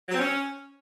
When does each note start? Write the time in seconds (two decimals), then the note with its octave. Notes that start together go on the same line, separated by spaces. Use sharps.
0.09 F#3
0.15 C4
0.20 C#4